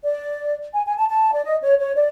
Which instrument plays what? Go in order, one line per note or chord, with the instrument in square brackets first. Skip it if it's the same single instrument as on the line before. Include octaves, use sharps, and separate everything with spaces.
[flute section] D5
G#5
G#5
A5
A5
D5
D#5
C#5
C#5
D5